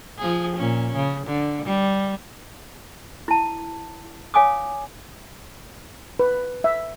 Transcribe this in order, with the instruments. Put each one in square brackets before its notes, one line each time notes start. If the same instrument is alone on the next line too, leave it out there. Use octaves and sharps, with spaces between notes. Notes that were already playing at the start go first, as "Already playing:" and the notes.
[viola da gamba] F3 G#4
A#2 C#4
C#3
D3
G3
[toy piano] E4 A5
C#5 F5 G#5 D6 D#6
[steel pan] B4
E5